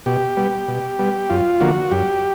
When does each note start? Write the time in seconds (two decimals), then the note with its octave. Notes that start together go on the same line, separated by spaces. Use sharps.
0.06 B2 G4
0.37 G3 B3
0.68 B2
0.99 G3 B3
1.30 F#2 F4
1.60 D3 F3 A#3 F#4
1.91 F#2 G4